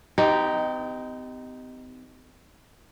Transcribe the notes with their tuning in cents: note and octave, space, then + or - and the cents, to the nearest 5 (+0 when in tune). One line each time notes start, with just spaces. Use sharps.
C4 -45 D#4 +0 G4 +0